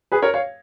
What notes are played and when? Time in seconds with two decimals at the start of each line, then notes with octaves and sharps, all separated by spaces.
0.12 G#4 B4
0.22 A#4 C#5
0.34 C#5 F5